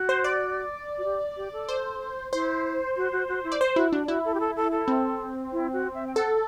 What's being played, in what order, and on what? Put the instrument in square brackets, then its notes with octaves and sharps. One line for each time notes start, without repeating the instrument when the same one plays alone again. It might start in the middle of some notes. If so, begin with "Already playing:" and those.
Already playing: [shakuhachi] F#4
[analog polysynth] C5
D5
[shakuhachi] F#4
G4
G4
A4
[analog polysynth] C5
[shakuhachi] E4 [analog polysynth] C5
[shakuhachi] F#4
F#4
F#4
E4
[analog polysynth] D5
C5
[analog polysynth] E4 [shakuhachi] F#4
[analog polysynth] D4 [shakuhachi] F#4
[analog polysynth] E4 [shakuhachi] F#4
[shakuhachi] A4
G4
A4
A4
A4
[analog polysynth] C4
[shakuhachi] E4
F#4
E5
G5
[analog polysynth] A4 [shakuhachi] F#5